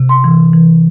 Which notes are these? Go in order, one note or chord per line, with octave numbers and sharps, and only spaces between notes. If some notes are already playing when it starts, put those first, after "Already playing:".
Already playing: C3
C6
E3
E3